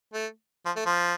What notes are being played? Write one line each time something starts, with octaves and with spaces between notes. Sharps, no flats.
A3
F3
A3
F3